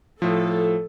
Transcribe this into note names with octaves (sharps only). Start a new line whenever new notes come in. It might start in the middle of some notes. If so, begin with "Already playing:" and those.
A2 F3 A4